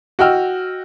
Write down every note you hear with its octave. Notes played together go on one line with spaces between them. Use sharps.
F#4 D#5 G5 E6 F6